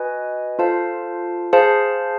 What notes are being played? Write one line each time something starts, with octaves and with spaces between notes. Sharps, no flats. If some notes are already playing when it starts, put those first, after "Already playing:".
Already playing: F#4 B4 D#5 G#5
F4 A4 C5 F5 A5
G#4 C5 F5 A5